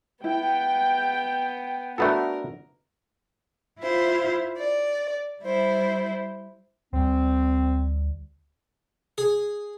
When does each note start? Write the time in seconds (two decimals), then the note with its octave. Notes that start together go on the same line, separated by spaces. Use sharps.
0.24 B3 E4 G5
1.98 A3 B3 D4 F#4 A4 A#4
3.80 E4 F4 C5 F5
4.57 D5
5.42 G3 E4 C5
6.93 D2 G3 C4
9.18 G#4